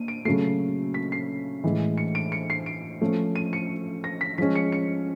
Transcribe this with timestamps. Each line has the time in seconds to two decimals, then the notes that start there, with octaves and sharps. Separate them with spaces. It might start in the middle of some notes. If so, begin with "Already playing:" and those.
Already playing: A#2 D4 D#7
0.08 D7
0.25 C#3 F#3 A3 C7
0.94 B6
1.12 C7
1.64 A2 E3 G#3
1.98 C#7
2.15 D7
2.32 C#7
2.50 C7
2.66 D7
3.01 F3 A3 C#4
3.36 D#7
3.53 C#7
4.04 A#6
4.21 B6
4.38 F3 G#3 C#4 B6
4.56 C#7
4.72 C#7